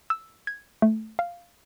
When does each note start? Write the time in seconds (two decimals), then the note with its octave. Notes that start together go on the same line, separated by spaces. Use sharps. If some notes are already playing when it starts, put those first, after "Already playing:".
0.10 E6
0.47 G#6
0.82 A3
1.19 F5